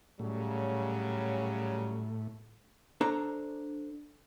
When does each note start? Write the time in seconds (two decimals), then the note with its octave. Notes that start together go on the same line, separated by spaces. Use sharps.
0.19 A2 C#3 F#3 G3
3.01 D4 A4 C5 A#5